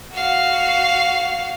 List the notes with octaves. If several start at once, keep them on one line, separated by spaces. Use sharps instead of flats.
F#4 F5